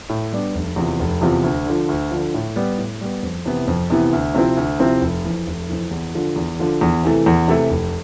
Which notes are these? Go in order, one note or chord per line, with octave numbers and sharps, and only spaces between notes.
A2
G3 B3 D4
F1
E2 C3 F3
F1
E2 C3 F3
D2
D3 F3
D2
D3 F3
A2
G3 B3
A2
G3 B3
F2
C3 E3 B3 E4
F2
C3 E3 B3 E4
D2
C3 F3 C4 E4
D2
C3 F3 C4 E4
F1
F2 E3
F1
F2 E3
E2
D3 F3
E2
D3 F3
E2
C3 E3 A3 E4
E2
C3 E3 A3 E4
F1